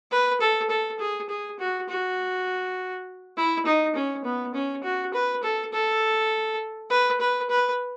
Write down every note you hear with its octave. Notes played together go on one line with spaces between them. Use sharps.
B4
A4
A4
G#4
G#4
F#4
F#4
E4
D#4
C#4
B3
C#4
F#4
B4
A4
A4
B4
B4
B4